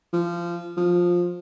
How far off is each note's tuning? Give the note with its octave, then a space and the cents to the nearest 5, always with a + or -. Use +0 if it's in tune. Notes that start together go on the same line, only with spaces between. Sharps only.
F3 -20
F3 +10